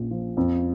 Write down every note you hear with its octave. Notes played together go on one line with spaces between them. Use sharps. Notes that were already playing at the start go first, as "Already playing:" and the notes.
Already playing: A#1 A#2 F3
F3
F2